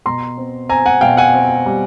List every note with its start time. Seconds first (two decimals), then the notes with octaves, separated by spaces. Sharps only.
0.06 B2 A#5 C6
0.37 C4
0.69 C4 G#5 A#5
0.86 F#5 G#5
1.01 B2 F5 G5
1.17 F#5 G#5
1.34 C4
1.66 G3